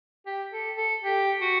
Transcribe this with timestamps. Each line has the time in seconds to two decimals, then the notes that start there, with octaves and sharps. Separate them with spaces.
0.26 G4
0.53 A4
0.77 A4
1.04 G4
1.41 F#4